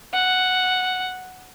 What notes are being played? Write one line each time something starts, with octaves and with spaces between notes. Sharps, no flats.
F#5